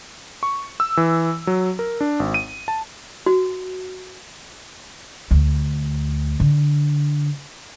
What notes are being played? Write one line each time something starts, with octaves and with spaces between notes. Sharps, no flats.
C#6
E6
E3
F#3
A#4
D4
G#1
D#7
A5
F#4
D2
D3